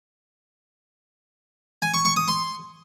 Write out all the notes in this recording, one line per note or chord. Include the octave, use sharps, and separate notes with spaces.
G#5
C#6
C#6
D#6
C6